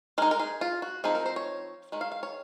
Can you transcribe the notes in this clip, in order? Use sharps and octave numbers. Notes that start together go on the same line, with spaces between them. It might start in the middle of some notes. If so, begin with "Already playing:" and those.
G#3 D#4 A#4
A#4
G#4
F4
F#4
F3 C4 D#4 G#4
A#4
C5
C#5
D#3 G#3
F5
F5
C#5